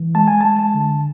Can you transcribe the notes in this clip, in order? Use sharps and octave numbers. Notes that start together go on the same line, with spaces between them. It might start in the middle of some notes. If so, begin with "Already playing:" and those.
Already playing: E3
G#3 A5
G#5
G#3 A5
A5
D3